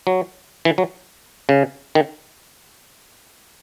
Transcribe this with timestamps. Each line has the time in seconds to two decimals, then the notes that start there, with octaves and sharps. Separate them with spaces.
0.07 F#3
0.65 E3
0.78 F#3
1.49 C#3
1.95 D#3